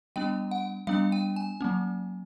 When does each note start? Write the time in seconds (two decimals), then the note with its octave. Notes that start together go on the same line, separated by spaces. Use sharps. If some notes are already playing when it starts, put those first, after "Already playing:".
0.16 G3 B3 D4 G5
0.51 F#5
0.87 G3 B3 D4 F5
1.12 G5
1.36 G#5
1.61 F#3 A#3 C#4